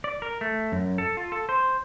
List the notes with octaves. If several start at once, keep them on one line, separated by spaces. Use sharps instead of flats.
D5
A#4
A3
F#2
A4
F4
A4
C5